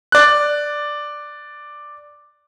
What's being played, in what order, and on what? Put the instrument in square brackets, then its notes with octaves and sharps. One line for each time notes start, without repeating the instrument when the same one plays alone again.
[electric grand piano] D5 F#6